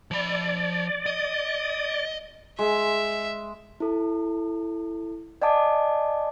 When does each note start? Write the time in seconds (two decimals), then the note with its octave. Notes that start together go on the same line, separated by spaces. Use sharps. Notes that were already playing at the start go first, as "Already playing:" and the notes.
0.11 F3 D5 B5
1.06 D#5
2.59 G#3 E5
3.80 E4 A4
5.42 D5 D#5 F#5 G#5 A5 D6